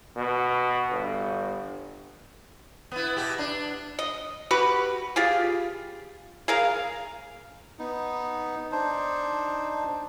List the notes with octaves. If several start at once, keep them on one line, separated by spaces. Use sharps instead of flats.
B2
G1
B3 E4
B2 E4 G4
D4
D#5
F#4 G4 B4
F4 G4 G#4
G#4 A#4 F5
B3 D#4
D4 D#4 C5